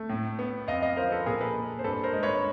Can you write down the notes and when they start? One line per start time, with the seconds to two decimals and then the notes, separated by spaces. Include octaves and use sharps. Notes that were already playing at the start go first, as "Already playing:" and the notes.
Already playing: A3
0.10 A2
0.39 B3
0.68 F2 D#5 F5
0.82 D#5 F5
0.97 F3 A#4 C5
1.12 A4 B4
1.26 A#2 G#4 A#4
1.41 A4 B4
1.55 A#3
1.79 C5
1.84 G2 A4 B4
2.03 A#4 C5
2.13 G#3
2.23 B4 C#5